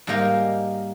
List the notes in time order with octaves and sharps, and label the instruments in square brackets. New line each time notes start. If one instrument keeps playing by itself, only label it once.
[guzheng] G#2 G3 A#3 D#4 A#4